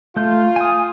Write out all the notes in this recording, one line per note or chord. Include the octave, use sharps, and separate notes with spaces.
A3 F4 G6
G#5 D#6